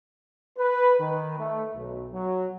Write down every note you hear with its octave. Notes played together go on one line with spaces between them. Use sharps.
B4
D#3
A3
B1
F#3